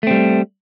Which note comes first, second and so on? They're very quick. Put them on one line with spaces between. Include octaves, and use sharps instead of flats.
A3 C4 G3